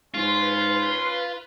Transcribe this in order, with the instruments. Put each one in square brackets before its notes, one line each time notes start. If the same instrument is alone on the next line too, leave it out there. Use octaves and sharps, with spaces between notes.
[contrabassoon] G#2 [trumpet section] C#4 C6 [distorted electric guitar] F4 [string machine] B4